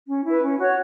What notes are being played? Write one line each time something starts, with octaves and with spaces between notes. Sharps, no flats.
C#4
E4 B4
C#4
F#4 C#5